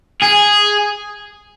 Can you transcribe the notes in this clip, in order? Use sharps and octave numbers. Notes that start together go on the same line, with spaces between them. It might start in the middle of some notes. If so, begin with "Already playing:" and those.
G#4